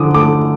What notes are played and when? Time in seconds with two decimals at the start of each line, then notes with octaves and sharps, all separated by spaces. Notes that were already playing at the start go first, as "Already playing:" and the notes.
Already playing: D3 F3 D6 D#6
0.14 A3 D6